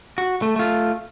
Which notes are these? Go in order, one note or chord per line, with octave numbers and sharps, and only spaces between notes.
F#4
A3
A3 F4